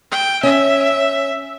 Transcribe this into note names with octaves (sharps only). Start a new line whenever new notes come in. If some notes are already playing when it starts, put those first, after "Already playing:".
G5
C#4 E5